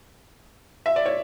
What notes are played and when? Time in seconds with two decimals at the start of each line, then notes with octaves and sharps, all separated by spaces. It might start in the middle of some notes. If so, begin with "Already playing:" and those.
0.86 E5
0.96 D5
1.06 C#5